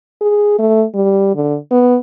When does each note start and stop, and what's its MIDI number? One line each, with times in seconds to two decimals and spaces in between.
0.21 0.55 68
0.59 0.85 57
0.95 1.30 55
1.35 1.57 50
1.71 1.97 59